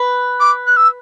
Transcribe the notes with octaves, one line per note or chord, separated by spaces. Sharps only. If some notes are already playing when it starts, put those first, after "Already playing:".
Already playing: B4
D6
F#6
E6